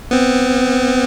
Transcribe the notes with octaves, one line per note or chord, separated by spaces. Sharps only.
B3 C4